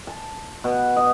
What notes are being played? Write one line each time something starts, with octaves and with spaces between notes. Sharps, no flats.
A5
B2
D#5